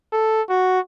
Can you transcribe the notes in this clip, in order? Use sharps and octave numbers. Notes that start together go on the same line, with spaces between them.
A4
F#4